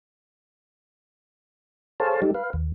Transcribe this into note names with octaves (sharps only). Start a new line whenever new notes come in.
G#4 A4 C5 C#5 F5 A5
G3 D#4 G4 A4
B4 F5
D#2